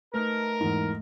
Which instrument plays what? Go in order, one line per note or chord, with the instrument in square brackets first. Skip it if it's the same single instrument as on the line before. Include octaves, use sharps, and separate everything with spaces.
[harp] A3 D#4 [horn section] A#4 [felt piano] B4
[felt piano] E2 G#2